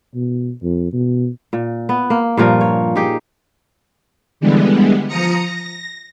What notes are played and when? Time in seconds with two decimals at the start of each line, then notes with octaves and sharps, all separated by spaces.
0.15 B2
0.63 F2
0.93 B2
1.53 A#2
1.89 B3
2.10 A#3
2.37 G2 A#2 F3 A#4
2.61 C#5
2.96 D#4 G4 G#4
4.40 D3 E3 G3 G#3 B3
5.08 F3 A#5 D#6 A#6 C#7
5.43 A#6